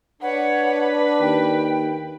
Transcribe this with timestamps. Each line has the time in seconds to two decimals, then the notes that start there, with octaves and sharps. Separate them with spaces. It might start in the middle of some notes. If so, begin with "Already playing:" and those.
0.22 D4 B4 C#5 F#5
1.21 D#2 G5